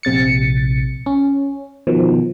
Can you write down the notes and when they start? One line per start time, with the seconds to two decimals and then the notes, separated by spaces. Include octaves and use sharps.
0.03 A#1 C3 A6 C#7
1.06 C#4
1.87 B2 D#3 F3